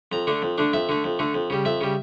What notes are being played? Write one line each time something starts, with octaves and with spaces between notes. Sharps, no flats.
F2 A#5
D3 A3 D4
F2
D3 A3 D4
F2 E5
D3 A3
F2
D3 A3
F2
C#3 G3
F2 E5
C#3 G3